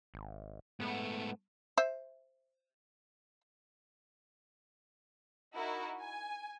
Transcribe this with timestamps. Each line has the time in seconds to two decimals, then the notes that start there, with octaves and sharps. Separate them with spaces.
0.14 G#1
0.80 G#2 A3 B3
1.78 C5 E5
5.53 D#4 E4 F#4 A#4
6.00 G#5